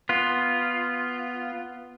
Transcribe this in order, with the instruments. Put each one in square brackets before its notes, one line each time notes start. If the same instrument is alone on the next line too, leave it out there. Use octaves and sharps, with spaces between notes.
[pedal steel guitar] B3 F4